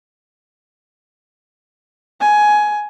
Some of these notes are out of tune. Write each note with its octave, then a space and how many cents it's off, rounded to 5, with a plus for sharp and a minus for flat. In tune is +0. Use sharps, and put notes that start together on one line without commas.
G#5 +15